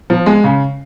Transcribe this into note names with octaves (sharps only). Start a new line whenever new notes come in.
F3
G#3
C#3